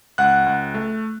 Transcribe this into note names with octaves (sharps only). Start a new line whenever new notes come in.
C#2 F#5 F#6
C#2
A3